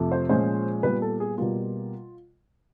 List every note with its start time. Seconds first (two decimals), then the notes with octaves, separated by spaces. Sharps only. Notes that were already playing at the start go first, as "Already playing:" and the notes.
Already playing: F2 C3 F3 A3
0.12 C5
0.29 A#2 F3 G#3 C#4 C5
0.83 A#2 G3 B3 B4
1.02 A4
1.20 G#4
1.38 B2 G3 A#3 F4